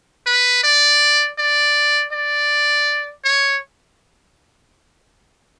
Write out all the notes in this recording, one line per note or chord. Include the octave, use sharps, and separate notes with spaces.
B4
D5
D5
D5
C#5